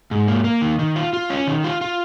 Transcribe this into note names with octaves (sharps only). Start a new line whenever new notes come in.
G#2
A#3
A#3
D#3
D#3
F4
F4
C#4
D#3
F4
F4